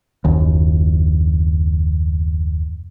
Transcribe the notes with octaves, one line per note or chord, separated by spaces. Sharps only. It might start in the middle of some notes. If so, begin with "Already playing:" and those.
F#1 D#2